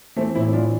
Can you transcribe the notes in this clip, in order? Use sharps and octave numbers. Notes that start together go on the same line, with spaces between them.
E3 A3 C4
A2 C4 E4
E3 D4 F4